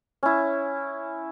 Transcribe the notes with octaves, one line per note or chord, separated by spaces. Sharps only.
C#4 E4